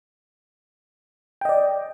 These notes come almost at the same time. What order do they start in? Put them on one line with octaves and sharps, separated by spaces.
G5 D#5 D5